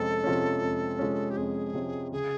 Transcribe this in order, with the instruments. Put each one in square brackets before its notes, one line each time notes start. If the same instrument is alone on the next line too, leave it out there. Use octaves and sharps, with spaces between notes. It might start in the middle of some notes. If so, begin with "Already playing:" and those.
Already playing: [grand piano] F2 C3 G#3 C#4 [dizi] A4
[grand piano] C3 F3 G#3 C#4
F2
C3 F3 G#3 C#4
[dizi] G4
[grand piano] F2 [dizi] G#4
[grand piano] C3 F3 G#3 C#4
[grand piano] C#3 [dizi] G#4